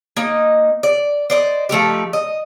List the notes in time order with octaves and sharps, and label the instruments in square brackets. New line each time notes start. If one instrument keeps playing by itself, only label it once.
[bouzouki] A#3 D#4 D#5
D5
C5 D5 D#5
F3 A3 D#4 G4
D#5